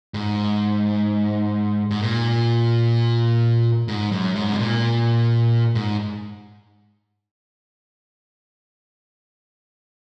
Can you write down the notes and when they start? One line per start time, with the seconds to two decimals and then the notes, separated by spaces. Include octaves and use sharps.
0.14 G#2
1.91 G#2
2.01 A#2
3.88 G#2
4.12 F#2
4.35 G#2
4.52 C3
4.58 A#2
5.75 G#2